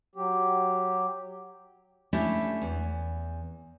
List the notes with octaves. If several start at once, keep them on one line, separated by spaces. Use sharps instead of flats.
F#3 G4
A3 C#4 D4 E4 G4
E2